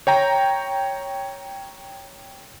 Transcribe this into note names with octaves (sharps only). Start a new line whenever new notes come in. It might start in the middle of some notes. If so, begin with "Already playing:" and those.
C#5 G5 A#5